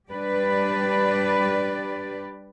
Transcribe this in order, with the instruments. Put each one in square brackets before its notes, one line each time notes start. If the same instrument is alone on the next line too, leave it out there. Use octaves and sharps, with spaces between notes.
[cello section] G3 D4 G4 B4 D5